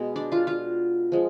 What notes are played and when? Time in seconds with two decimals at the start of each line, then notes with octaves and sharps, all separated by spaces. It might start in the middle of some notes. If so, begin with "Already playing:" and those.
Already playing: B2 G#3 B3
0.16 D4 D5
0.32 F4 F5
0.47 F4 F5
1.12 F3 G#3